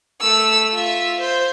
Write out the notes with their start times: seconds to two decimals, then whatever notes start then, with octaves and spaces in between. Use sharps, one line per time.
0.21 A3 E6
0.74 F4 E5
1.20 C5